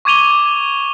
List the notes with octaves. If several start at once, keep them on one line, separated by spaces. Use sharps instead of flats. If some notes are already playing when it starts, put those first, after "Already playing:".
C#6 D6 G#6 D#7 F7 G7